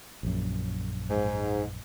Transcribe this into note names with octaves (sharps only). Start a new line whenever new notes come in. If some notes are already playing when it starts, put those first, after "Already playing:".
A#1 F#2
G#2